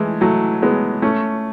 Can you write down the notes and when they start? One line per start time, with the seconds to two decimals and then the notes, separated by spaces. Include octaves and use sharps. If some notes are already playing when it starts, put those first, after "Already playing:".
Already playing: E3 G#3 A3
0.21 F#3 A3
0.62 G#3 B3
1.02 A3 C#4